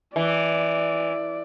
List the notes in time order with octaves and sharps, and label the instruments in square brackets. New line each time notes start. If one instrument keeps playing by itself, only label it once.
[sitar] E3 [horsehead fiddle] D5